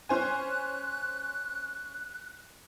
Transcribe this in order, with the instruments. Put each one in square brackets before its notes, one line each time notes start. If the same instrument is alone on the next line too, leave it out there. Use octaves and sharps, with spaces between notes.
[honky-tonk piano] C#4 C5 G#5 [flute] F#6